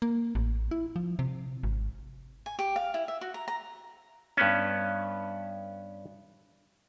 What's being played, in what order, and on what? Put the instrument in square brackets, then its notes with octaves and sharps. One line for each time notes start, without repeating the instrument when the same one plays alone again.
[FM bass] A#3
A1
E4
F3
C3
G#1
[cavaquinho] G#5
G4
F5
E4
E5
F#4
A#5
A#5
[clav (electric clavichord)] G2 B3 C#4